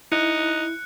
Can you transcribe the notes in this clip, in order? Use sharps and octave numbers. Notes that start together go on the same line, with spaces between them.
D#4 E4 F#6 C#7